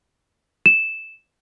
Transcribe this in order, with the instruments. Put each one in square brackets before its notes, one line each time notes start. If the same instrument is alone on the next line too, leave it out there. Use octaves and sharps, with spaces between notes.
[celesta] E7